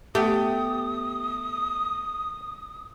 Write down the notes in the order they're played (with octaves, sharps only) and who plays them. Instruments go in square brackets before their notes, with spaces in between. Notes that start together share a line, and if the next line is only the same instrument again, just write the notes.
[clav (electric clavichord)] A3 [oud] B3 G4 [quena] D#6